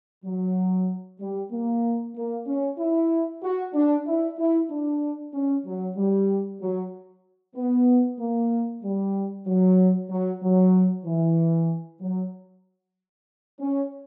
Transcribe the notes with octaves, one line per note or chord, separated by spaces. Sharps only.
F#3
G3
A#3
A#3
C#4
E4
F#4
D4
E4
E4
D4
C#4
F#3
G3
F#3
B3
A#3
G3
F#3
F#3
F#3
E3
F#3
C#4